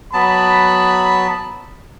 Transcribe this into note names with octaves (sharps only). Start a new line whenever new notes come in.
F#3 B3 A5 B5